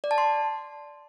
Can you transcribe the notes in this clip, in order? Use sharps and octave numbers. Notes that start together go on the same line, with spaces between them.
D5
A5
C6